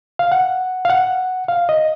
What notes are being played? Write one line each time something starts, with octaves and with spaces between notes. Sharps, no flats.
F5
F#5
F5
F#5
F5
D#5